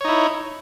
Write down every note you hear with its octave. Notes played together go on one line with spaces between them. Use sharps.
D#4 E4 C#5